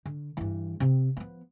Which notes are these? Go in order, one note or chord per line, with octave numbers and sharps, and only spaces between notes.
D3
G2 E3
C3 C4
F3 B3